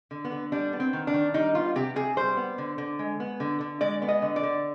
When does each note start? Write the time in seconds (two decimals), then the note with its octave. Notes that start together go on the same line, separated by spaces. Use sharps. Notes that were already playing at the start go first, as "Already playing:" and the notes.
0.11 D3
0.25 B3
0.32 D3
0.52 G3 D4
0.73 B3
0.80 C4
0.93 D#3
1.07 D4
1.14 D#3
1.34 G3 D#4
1.54 B3 F4
1.75 C3 G4
1.96 C3 G#4
2.17 G3 C5
2.37 B3
2.58 D3
2.78 D3
2.99 G#3
3.20 B3
3.40 D3
3.61 D3
3.81 G#3 D5
4.02 B3
4.08 D#5
4.22 D3
4.36 D5
4.43 D3